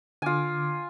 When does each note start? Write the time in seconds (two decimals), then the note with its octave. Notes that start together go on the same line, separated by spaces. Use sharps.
0.22 D3 F4 G#5 D6